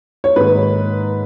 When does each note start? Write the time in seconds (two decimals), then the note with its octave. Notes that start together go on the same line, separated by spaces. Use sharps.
0.24 C#5
0.36 G#2 D#3 A#3 B4